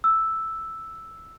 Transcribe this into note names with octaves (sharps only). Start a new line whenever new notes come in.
E6